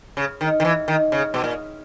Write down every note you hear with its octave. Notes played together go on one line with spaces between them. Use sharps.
C#3
D#3
D#3
E3
D#3
C#3
B2
A#2